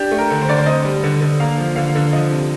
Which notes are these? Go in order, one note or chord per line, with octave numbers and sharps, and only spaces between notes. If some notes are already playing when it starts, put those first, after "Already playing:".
Already playing: D4 G4
A3
A#4
D3
C5
D3 D5
C5
C4 D#5
G3
D3
D3
A#3 F5
F3
D3 F5
D3
F3 D#5
C3